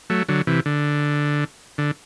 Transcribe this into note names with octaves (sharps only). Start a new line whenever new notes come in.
F#3 A3
D3 F#3
C3 E3
D3
D3